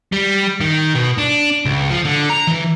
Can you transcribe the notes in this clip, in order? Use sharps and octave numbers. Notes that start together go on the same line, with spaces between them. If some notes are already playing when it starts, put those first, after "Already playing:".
G3
D#3
B2
D4
C#2
F3
D3
A#5
E3